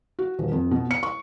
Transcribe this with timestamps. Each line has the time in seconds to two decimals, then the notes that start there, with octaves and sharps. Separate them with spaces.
0.19 F#4
0.39 D#1
0.52 F2
0.71 B2
0.91 C#7
1.03 C#6